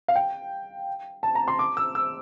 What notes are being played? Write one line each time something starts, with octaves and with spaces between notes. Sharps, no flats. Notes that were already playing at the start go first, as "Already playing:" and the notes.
F5
G5
A5
A#5
C6
D6
E6
E6